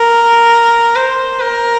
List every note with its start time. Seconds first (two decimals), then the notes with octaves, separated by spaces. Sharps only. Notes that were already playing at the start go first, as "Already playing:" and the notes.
Already playing: A#4
0.95 C5
1.41 A#4